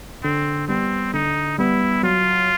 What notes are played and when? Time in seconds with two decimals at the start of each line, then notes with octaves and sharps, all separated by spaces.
0.23 D3 C4
0.68 G3 B3 C4
1.13 D3 D#4
1.58 G3 B3 E4
2.03 F#3 F4